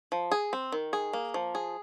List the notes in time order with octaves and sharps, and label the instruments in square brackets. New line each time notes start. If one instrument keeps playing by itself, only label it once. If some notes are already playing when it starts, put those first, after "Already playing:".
[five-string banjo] F3
G#4
C4
D#3
G#4
A#3
F3
G#4